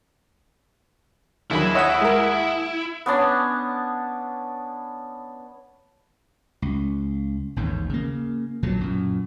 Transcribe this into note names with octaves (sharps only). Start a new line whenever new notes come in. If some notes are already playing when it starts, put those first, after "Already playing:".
D#2 D3 D#3 F#3 E4 G#4 B5
C#5 D#5 E5 F#5 D#6
G#3 A#4
B3 C#4 D4 A5
C#2
A1 D#2 G#2
C#3 A#3
B1 A#2 D3 F#3
F#2 A#2